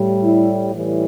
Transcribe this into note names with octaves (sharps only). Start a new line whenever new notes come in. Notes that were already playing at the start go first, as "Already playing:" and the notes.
Already playing: A2 G3
E4
A2 E3 G3